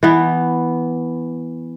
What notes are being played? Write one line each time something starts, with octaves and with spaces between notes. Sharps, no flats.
E3 B3